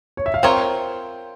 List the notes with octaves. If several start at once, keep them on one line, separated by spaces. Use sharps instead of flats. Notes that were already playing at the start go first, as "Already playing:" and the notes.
C#5
E5
F5
C4 F4 A#4 C#5 G5